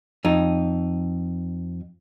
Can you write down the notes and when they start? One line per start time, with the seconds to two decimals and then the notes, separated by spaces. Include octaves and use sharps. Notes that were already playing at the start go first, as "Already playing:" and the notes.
0.25 F2 D#4